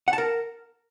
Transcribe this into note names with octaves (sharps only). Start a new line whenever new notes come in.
F#5
A5
A#4